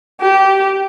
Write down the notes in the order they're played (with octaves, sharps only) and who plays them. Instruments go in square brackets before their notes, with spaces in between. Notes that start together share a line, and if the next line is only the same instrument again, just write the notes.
[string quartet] G4